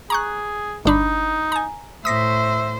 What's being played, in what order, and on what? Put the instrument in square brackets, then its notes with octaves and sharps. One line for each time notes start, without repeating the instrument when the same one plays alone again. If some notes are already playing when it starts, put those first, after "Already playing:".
[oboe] G#4 [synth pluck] A#5 C#6 F#6
[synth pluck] G1 D4 B5 [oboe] D#4
[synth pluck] G#5 A#5
[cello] A2 C5 [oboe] E5 [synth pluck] D#6 A#6 B6